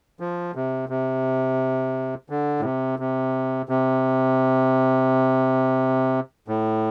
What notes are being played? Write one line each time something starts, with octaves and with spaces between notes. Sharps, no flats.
F3
C3
C3
D3
A2
C3
C3
C3
A2